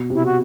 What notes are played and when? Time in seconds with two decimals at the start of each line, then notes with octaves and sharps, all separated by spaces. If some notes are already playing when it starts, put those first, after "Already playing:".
Already playing: B2
0.10 C3 E4
0.26 F#4